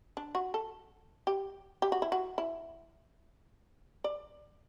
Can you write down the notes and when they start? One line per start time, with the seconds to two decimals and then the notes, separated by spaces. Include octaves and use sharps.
0.17 D4
0.35 F#4
0.54 A4
1.27 G4
1.82 G4
1.92 F#4
2.02 E4
2.12 F#4
2.38 E4
4.04 D5